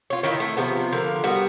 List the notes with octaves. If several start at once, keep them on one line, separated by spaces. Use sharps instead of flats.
F4 C#5
D#3 D#4 E4
A3
C3 F3 B3
D3 F3 A#4
G3 B3 F#4